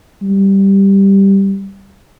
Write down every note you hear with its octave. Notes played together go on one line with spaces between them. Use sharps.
G3